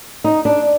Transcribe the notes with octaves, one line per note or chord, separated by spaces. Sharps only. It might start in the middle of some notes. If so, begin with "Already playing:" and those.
D#4
D4